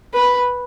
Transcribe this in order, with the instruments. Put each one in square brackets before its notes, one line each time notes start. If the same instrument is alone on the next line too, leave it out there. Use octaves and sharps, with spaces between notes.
[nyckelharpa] B4